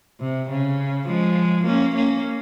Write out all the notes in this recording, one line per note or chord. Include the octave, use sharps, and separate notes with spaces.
C3
C#3
F3 G#3
A#3 C#4
A#3 C#4